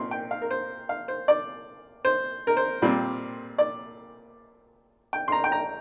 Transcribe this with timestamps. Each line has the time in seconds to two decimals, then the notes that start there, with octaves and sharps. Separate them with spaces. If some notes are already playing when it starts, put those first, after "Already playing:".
Already playing: A#2 C4 C6
0.11 G5
0.31 F5
0.42 A#4
0.50 C5
0.89 F5
1.08 C5
1.28 D5
2.05 C5
2.47 A#4
2.57 C5
2.82 A#2 G3 C4
3.58 D5
5.13 G5
5.28 C6
5.32 A#5
5.44 G5
5.52 A#5